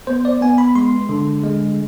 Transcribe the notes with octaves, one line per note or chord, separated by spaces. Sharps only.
B3 C5
D5
B3 G#5
B5
G#3 C6
D3
G#3